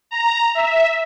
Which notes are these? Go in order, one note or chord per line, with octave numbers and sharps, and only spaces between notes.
A#5
E5